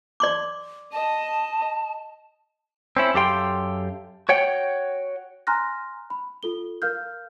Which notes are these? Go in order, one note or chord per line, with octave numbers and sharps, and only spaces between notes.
D5 C6 D6
D#5 A5
C4 C#4 E4
F#2 G4 A4 F5 G5 C6
F#4 C#5 F#5 G5
G#5 A#5 C6 F6 F#6 A#6
B5
F4 A4 G7
A#4 F5 F6 G6